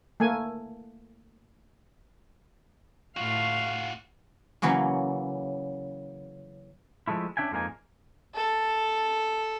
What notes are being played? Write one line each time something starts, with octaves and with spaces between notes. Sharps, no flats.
A3 A#3 G#5
A2 F4 F#4 F5
C#3 E3 F#3 A#3 C#4
F3 G#3 A3 E4
C#4 D4 E5 G5 G#5
F2 G#2 A#3 D#4 G#5
A4